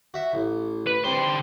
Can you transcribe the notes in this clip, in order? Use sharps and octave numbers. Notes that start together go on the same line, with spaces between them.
F#4 E5
A1
B4
D3 G3 C4 C6